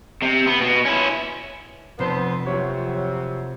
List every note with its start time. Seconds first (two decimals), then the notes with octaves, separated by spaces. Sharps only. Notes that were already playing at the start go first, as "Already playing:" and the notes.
0.22 C3
0.46 B3
0.61 B2
0.85 C#4 E4
1.99 F1 B3 C4 C5
2.46 C3 F3 F#3 C#5